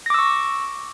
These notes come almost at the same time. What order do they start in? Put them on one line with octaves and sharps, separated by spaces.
A#6 D6 E6 C#6